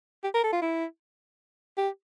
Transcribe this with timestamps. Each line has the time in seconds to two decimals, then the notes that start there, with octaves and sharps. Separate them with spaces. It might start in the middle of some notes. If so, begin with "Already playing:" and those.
0.24 G4
0.34 A#4
0.43 A4
0.53 F4
0.62 E4
1.78 G4